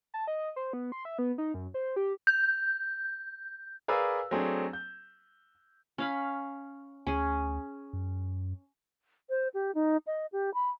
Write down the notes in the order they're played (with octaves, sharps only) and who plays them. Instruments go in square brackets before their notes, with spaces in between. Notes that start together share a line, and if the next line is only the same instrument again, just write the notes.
[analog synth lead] A5
D#5
C5
B3
C6
E5
B3
D#4
F#2
C5
G4
[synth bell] G6
[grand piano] G#4 A#4 B4 D5 F5 E6
F#3 A3 C4 D4 G#4
G6
[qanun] C#4 F5 B5
[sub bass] D2 [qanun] C#4 G#4
[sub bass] F#2
[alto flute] C5
G4
D#4
D#5
G4
B5